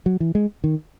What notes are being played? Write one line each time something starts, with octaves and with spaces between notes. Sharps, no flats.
F#3
E3
G#3
D#3